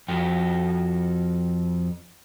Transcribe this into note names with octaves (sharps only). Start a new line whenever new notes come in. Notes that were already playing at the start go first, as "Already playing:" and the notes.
F2 F#4 A4 G5